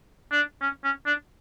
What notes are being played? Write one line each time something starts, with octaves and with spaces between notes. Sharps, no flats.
D4
C#4
C#4
D4